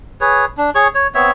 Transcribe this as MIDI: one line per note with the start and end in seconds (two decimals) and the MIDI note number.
0.21 0.45 68
0.21 0.45 71
0.21 0.45 73
0.57 0.70 62
0.75 0.88 68
0.75 0.88 73
0.75 0.88 85
0.95 1.07 73
1.15 1.31 59
1.15 1.31 60
1.15 1.31 73
1.15 1.31 76